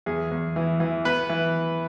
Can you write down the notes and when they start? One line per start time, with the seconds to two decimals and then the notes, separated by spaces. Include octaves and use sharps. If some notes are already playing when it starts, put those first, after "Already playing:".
0.06 E2 G#4
0.31 E2
0.56 E3
0.80 E3
1.05 B3 B4
1.29 E3